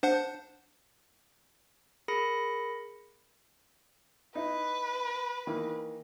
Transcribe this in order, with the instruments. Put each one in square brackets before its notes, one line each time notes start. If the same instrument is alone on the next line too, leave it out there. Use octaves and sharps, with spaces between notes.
[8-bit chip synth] D4 C5 F#5
[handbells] G#4 A#4 B5 A#6 C#7
[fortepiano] D#4 E4 [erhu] B4
[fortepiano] D#3 E3 A#3